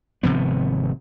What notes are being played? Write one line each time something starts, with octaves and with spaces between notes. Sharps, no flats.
G#1 C3 F3 B3